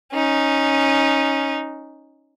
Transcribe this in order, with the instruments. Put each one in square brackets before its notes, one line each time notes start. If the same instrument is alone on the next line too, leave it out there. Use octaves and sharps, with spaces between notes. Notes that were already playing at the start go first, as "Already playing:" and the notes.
[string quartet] C#4 D#4